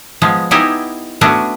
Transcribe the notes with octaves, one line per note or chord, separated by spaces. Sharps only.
F3 G#3 B3
B3 D#4 E4 G4 F#5 G#5
A3 B3 C#4 D4 F#4